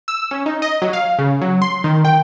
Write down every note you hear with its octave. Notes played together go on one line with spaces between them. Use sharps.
E6
C#4
D#4
D#5
F#3
F5
C#3
F#3
C6
D#3
G5